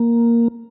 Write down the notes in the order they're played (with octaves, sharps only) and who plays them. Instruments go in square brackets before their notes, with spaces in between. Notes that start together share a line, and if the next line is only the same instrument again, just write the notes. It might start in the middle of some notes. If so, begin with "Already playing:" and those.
Already playing: [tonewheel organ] A#3